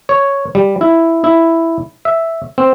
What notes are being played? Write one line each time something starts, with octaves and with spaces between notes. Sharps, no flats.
C#5
G3
E4
E4
E5
C4